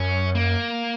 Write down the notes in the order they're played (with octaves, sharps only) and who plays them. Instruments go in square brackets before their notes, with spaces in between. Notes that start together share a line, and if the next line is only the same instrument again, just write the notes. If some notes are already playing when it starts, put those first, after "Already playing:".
Already playing: [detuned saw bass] F#2 [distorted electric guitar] C#4
[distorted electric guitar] A#3